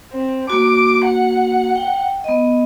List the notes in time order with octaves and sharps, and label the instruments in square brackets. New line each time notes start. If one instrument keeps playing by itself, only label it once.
[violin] C4
[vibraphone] A#3 F#4 [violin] D6
[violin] F#5
[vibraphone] G5
B3 D#5